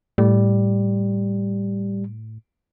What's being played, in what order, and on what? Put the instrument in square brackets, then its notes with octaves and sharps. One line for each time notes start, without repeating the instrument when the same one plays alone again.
[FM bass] A2 [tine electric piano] G3